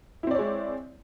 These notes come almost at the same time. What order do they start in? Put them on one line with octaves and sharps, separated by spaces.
E4 C4 D5 C#5 G#3